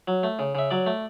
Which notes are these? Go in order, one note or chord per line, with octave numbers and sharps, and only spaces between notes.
F#3
A3
C#3
C#3 E5
F#3 D5
A3